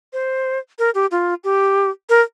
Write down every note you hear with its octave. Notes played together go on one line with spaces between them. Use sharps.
C5
A#4
G4
F4
G4
A#4